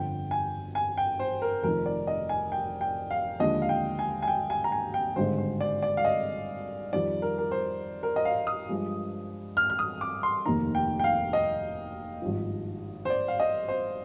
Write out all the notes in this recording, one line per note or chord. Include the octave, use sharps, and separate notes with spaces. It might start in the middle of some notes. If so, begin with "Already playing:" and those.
Already playing: G1 F2 D3 G5
G#5
G#5
G5
C5
A#4
F1 F2 D#3 A#4
D5
D#5
G#5
G5
G5
F5
D#2 D3 F3 G#3 D4 D#5
F5
G5
G#5
G#5
G5
G#5
A#5
G#5
G5
G#1 G2 D3 G#3 C5
C5
D5
D5
F5
D#5
F2 D#3 G3 D5
A#4
A#4
C5
A#4
D#5
F5
D#6
G2 F3 G#3
F6
F6
D#6
D6
C6
F1 D#2 D#3 A#3 D#4 A#5
G5
G5
F5
D#5
G#1 G2 F3
C5
D5
F5
D#5
C5